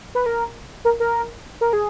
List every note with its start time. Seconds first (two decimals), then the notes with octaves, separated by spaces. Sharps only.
0.15 B4
0.26 A#4
0.85 A#4
1.00 A#4
1.61 A#4
1.73 G#4